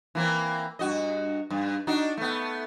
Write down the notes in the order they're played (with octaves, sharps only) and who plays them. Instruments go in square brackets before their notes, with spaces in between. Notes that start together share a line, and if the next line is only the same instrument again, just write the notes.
[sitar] E3 A#3 C4
G2 F#4 D#5
G2
D4 D#4 F#4
A3 B3